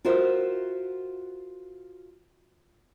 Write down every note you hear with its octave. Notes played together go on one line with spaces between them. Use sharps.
F4 F#4 A#4 C5 E5